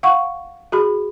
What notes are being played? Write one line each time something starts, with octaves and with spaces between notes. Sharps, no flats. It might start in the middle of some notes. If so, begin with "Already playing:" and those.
F5 F#5 C#6
F#4 G#4 B5